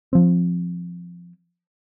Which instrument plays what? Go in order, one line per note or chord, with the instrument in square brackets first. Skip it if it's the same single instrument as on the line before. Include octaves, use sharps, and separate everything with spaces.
[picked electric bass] F3 C4